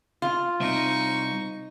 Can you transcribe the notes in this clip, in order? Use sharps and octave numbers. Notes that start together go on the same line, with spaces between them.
F4
C2 C4 D#4 E5 C#6